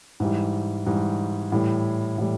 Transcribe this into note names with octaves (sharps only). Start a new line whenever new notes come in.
G#2 E3 G3
G#2 E3 G3
A2 E3 G3
A2 E3 G3